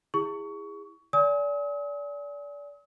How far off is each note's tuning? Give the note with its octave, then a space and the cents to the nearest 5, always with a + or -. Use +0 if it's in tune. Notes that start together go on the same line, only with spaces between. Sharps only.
E4 +0 G#4 -30 C#6 +20
D5 -30 G#5 +0 D#6 +45